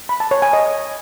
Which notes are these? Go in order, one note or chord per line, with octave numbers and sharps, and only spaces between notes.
B5
A5
C#5
G#5
D#5